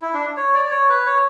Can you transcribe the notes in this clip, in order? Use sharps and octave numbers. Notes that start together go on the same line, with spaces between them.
E4
D4
C#5
D5
D5
C#5
B4
C#5